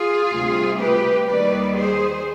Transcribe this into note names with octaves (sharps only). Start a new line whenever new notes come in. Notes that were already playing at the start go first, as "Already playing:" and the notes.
Already playing: F4 G#4
D2 C3 G3
G4 B4
D#2 D#3 G3 B4 D5
G#4 C5